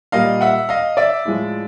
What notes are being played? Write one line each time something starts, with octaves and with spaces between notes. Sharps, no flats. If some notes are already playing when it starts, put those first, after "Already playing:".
A#2 G3 A#3 D#5 F5
E5 F#5
D#5 F5
D5 E5
A2 F3 G#3